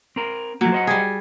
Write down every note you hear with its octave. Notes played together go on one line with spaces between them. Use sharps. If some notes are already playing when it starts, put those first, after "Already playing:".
C4 A#4
F3 F#3 A3 A#3
C5 D#5 F#5
G3 G#4